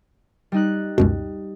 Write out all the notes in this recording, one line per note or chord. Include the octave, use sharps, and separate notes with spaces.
G3 D#4 F#6
C#2 F#2 B2